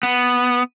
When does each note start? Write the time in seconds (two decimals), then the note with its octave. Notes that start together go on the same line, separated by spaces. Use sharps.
0.03 B3